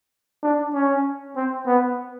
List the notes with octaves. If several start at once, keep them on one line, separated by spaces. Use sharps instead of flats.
D4
C#4
C4
B3